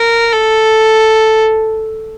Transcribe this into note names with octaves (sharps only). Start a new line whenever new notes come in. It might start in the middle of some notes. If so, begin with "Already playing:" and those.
Already playing: A#4
A4